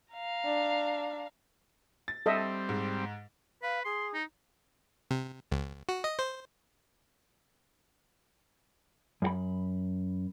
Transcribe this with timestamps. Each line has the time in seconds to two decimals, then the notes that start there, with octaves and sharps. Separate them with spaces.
0.13 F5 A#5
0.46 D4
2.08 A6
2.26 G3 C4 A4 D#5 E5
2.69 G#2
3.63 B4 F5
3.84 G#4 C6
4.14 D#4
5.11 C3
5.51 C#2
5.89 F#4
6.04 D#5
6.19 C5
9.22 F#2 F#4 B5